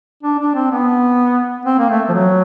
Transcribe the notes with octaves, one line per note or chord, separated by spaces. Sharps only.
D4
D4
C4
B3
C4
A#3
A3
F3
F#3